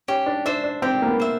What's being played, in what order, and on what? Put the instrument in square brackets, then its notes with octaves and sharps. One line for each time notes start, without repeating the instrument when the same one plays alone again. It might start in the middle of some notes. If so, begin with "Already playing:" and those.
[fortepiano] C#4 [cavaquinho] G4
[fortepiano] D4
[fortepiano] D4 [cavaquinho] C5 E5
[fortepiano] D4
[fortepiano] C4 [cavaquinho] G4
[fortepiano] A#3
B3
[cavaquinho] C5 E5